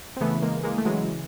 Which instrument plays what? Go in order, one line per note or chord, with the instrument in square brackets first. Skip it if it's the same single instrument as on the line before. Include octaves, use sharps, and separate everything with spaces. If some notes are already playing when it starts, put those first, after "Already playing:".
[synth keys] C4
C#3 E3 A3 B3
G#3 A#3
G#3 A#3
A3
C#3 E3 F#3 G#3